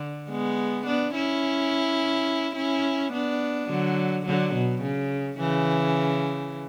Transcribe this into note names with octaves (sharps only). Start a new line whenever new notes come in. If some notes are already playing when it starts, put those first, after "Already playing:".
Already playing: D3
G#3 B3
B3 D4
C#4 E4
C#4 E4
B3 D4
D3 F#3
D3 F#3
B2
C#3
C#3 E3